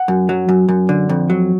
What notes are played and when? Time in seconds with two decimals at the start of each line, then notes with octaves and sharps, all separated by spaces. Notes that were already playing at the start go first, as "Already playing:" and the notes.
Already playing: F#5
0.08 F#2
0.29 F#3
0.49 F#2
0.69 F#2
0.89 D3
1.09 F2
1.30 F#3